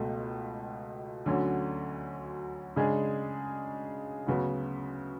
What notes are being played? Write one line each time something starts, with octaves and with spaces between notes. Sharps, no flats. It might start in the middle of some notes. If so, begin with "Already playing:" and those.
Already playing: C#2 B2 A3
D2 D3 F#3 C#4
C#3 G#3 D4 G#4
D2 C#3 F#3 B3